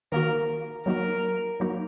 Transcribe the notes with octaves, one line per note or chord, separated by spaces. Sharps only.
D#3 A#3 F#4 A#4
F#3 A#3 D#4 F#4 A#4
F#3 A#3 D#4 F#4